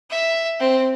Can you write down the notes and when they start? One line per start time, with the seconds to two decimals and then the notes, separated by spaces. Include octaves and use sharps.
0.10 E5
0.60 C4